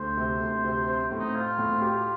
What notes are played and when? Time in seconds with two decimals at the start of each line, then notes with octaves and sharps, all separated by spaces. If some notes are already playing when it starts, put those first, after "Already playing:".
Already playing: D2 C5
0.17 C3
0.40 D2
0.64 C3
0.87 C4 C5
1.11 A2
1.19 D#4
1.35 C4 F4
1.58 A2
1.82 F4 G4